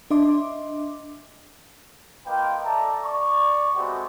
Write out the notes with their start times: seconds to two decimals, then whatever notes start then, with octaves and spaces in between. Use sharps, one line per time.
0.10 D4 D#5 E5 C6 D6
2.26 A#3 F4 B4 D#5 G5
2.64 A4 D5 E5 A5 A#5
3.03 D5 C#6
3.76 G#3 A3 B3 C4 F#4 G4